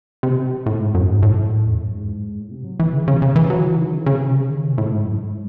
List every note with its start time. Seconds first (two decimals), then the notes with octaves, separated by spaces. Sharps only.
0.23 C3
0.66 A2
0.80 G#2
0.95 F#2
1.09 G#2
1.23 A2
1.66 E2
1.80 F#2
1.94 G#2
2.40 A2
2.51 C3
2.64 F#3
2.80 E3
2.93 C#3
3.08 C#3
3.22 C#3
3.36 E3
3.50 F#3
3.64 E3
3.78 D#3
3.93 C#3
4.06 C#3
4.21 C3
4.35 C#3
4.50 D#3
4.64 C3
4.78 A2
4.92 G#2
5.06 F#2
5.21 G#2